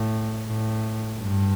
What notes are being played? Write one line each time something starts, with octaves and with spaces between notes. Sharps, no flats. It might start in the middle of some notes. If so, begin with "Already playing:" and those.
Already playing: A2
A2
G2